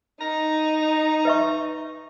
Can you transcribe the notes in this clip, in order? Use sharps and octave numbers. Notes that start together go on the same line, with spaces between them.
D#4 A#5
B4 E5 C#6